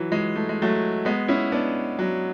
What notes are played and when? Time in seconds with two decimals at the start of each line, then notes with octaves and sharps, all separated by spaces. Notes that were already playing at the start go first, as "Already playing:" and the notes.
Already playing: E3 F#3
0.12 E3 G#3
0.36 A3
0.49 G#3
0.62 F#3 A3
1.05 G#3 B3
1.28 C#4 E4
1.52 B3 D4
1.99 F#3